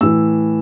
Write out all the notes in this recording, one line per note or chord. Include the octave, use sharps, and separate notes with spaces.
A2 E3 E6